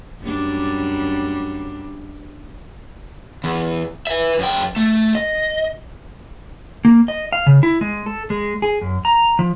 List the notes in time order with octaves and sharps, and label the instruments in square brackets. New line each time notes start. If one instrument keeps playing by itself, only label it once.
[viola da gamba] F#2 G3 D4
[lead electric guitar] E2
B4 E5
F#2 G5
A3
D#5
[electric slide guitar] A#3
D#5
F5
C#3
E4
G#3
A4
G#3
G#4
F#2
A#5
F3